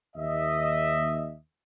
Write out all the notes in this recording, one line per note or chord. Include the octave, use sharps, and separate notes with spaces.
D#2 D#5 E5